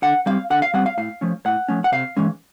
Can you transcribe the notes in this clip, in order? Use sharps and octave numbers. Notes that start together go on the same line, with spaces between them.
D3 F#5
G3 C4 F5
D3 F#5
F5
G3 C4 F#5
F5
A2 F5
F3 A3 C#4
A2 F#5
F3 A3 C#4
F#5
C3 F5
E3 G#3 C#4